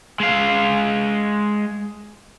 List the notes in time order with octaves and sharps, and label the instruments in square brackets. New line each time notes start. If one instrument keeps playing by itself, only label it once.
[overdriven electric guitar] G#3 F5